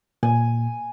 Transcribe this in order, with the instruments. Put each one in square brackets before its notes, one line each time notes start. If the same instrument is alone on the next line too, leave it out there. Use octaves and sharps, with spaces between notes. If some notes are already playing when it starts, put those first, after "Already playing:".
[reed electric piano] A#2 [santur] G#5